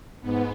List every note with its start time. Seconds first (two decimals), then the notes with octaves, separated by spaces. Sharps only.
0.21 G#2 B3